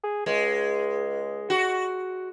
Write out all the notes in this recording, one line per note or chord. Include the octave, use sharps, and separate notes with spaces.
G#4
C#2 G#3
F#4